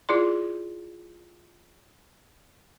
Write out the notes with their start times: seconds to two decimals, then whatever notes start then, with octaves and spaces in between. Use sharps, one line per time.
0.09 E4 F4 G#4 D5 C6